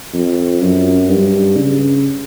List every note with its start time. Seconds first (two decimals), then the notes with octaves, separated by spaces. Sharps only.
0.13 F2
0.61 F#2
1.09 G2
1.57 C#3